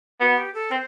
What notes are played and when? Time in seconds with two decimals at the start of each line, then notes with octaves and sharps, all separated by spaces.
0.21 B3 F#4
0.37 G4
0.54 A4
0.71 C4 C5